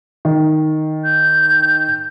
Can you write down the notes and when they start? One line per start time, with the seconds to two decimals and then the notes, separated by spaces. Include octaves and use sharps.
0.25 D#3
1.05 G6